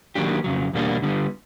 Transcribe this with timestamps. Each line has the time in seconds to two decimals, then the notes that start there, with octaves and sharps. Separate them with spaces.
0.15 D#3 F#3 A#3 D4 G4
0.44 F2 C#3 F#3
0.73 E2 B2 G3 A#3 D4
1.02 D3 G3 B3